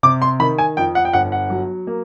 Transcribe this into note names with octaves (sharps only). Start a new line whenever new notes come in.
C3 D6
C6
D#3 B5
G#5
F2 G5
F#5
G5
G1 F#5
F#5
F#3
A#3